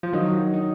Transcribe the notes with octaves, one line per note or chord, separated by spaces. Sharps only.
F3
D#3 F#3 D#4
D#4